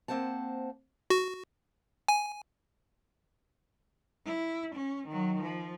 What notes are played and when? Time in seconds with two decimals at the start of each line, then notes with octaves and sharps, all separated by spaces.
0.08 A#3 C4 C5 F#5 A5
1.10 F#4
2.08 G#5
4.26 E4
4.75 C#4
5.07 D#3 F#3
5.42 F3